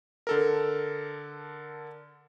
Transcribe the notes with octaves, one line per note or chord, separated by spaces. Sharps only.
D3 A4 A#4